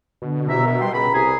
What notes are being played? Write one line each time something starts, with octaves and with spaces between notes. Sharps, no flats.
B2 D3
E2 C3 E5 A#5
A#4 E5
G3 G5 C6
C#2 A#5 B5
C2 G#4